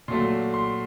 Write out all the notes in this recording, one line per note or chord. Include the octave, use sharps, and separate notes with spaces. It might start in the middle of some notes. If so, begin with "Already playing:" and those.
A#2 F#3 A3 C6
C6